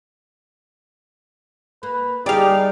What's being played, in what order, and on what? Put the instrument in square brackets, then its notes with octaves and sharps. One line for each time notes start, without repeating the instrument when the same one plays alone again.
[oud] A#3 [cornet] B4
[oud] G3 G#4 [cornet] D#4 [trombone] G4 [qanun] D5 F5